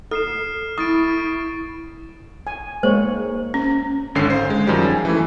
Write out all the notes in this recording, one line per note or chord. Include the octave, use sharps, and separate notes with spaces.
A4 F6 C7 E7
E4 C#6 D#6 A6 D7
G#5
G#3 A#3 C5 C#5
C#4
G#1 D3 C#4 C7
C5 F5
G#3
F#2 D#3 F3 G3
G#5
E3 A3